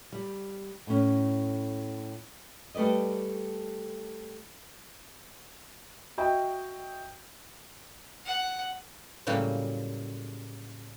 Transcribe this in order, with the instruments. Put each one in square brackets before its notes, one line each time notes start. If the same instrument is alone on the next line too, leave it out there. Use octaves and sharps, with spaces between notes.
[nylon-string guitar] G3
A2 C#4
G3 A3 B4 D5 D#5
[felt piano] F#4 D#5 E5 G5
[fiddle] F#5
[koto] A2 C#3 F#3 G3 A#3 G4